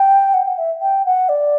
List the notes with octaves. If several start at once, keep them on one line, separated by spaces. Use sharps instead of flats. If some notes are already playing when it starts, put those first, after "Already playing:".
Already playing: G5
F#5
F#5
E5
G5
F#5
D5